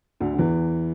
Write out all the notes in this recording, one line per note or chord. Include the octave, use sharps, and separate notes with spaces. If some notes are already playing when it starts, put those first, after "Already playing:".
D2 D3
D3
E2 E3